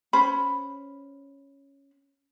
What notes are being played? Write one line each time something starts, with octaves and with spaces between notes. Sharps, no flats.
C#4 C5 B5